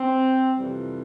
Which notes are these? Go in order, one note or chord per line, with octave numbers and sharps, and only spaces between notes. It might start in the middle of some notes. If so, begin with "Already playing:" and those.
Already playing: C4
F2 C3 E3 G3